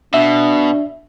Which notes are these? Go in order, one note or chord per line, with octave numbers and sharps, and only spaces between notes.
B2 D4 E5